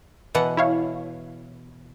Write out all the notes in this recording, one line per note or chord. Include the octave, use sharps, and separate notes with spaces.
B2 E3 F#5
E4 C#5 F5